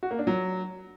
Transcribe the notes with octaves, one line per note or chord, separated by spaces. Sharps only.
F#4
A#3
D4
F#3